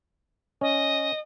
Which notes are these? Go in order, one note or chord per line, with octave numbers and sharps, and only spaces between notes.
C#4 D#5